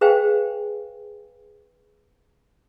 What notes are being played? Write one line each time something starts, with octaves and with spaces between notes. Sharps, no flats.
G#4 B4 C5 F5 G5 G#5